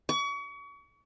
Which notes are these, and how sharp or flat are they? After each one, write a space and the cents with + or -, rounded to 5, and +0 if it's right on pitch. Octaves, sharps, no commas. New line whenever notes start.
C#6 +35